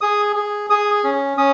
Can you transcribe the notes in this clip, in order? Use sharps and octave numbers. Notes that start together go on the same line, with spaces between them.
G#4 D#6
G#4
G#4 D#6
C#4
C#4 D#6